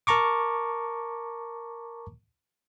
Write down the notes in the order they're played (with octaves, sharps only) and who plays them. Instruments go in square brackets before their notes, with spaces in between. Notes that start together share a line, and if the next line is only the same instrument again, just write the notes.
[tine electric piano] A#4 A5 A#5 C#6 D6